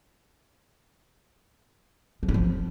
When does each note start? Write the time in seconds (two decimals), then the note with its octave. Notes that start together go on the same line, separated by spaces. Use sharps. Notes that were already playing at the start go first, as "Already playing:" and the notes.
2.23 F3
2.29 D#4
2.34 F3